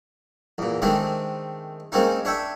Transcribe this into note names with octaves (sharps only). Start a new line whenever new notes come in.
E2 A#2
D#3 G#3 A3 C4 D4
G#3 A#3 C4 C#4 D#4
D4 C#5 E5 G5